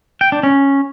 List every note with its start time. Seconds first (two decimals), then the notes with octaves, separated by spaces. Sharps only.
0.21 G5
0.32 D4
0.43 C#4